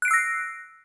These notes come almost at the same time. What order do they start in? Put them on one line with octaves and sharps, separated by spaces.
F#6 D7 C7 E6 A#6